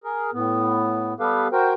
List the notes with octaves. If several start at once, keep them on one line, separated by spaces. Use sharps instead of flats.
G#4 A#4
A2 B3
G3 B3 G4 A4 B4 F5
F#4 A#4 C5 G5